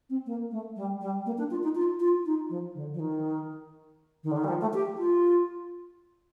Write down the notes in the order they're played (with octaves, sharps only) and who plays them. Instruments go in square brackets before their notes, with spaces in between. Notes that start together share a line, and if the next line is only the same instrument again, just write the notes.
[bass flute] C4
A#3
A3
G3
G3
A#3
D4
F4
D#4
F4
F4
D#4
F3
D3
F3
D#3
D#3
D3
D#3
G3
F3
A3
G4
F4